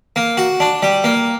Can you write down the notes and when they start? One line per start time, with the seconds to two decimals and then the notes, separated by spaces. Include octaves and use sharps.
0.16 A#3
0.37 F#4
0.60 D4
0.83 G3
1.04 A#3